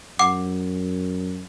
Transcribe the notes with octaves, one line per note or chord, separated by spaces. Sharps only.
F#2 F#5 D6